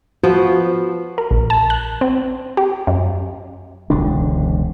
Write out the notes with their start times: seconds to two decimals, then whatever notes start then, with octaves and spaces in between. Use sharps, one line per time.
0.24 F3 B3 F#4 C5
1.18 A#4
1.31 A#1
1.50 A5
1.70 F#6
2.01 C4
2.57 G4
2.87 F#2
3.90 E1 C#2 D3 D4